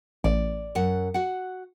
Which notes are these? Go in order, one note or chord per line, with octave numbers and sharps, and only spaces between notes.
A1 D5
F#2 F#5
F#4 F#5